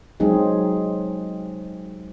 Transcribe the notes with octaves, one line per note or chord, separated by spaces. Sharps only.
F#3 G#3 C4 D#4 G#4